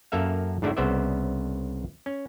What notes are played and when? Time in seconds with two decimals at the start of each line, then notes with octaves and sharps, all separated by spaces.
0.12 F#2 A#3 A4 E5 F5
0.62 G#2 D3 A3 D4 E4 F#4
0.77 C2 C#3 B3 C5 D5 E5
2.06 C#4